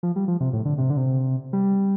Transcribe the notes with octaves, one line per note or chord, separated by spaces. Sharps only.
F3
G3
F3
C3
A2
D3
C3
D3
C3
G3